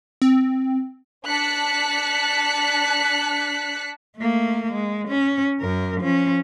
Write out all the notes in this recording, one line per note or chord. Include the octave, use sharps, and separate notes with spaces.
C4
D4 A5 F#6 B6 C#7
A3 A#3
G#3
C#4
F#2 A#4
F3 C#4